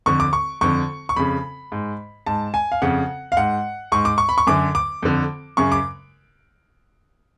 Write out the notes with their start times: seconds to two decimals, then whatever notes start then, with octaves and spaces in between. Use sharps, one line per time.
0.06 F2 D3 C#6
0.20 D6
0.33 C#6
0.61 F2 D3 C#6
1.09 C#6
1.16 F2 C#3 B5
1.72 G#2
2.26 G#2 A5
2.54 G#5
2.72 F5
2.82 F2 C#3 F#5
3.32 F5
3.37 G#2 F#5
3.92 G#2 C#6
4.05 D6
4.18 C#6
4.29 B5
4.38 C#6
4.47 F#2 D3 D6
4.75 D6
5.02 F2 D3
5.57 F#2 C#3 C#6
5.72 D6